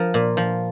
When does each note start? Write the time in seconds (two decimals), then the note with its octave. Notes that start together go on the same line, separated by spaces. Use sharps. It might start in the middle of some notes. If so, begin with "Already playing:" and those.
Already playing: F3 A#4
0.14 A#2
0.37 F3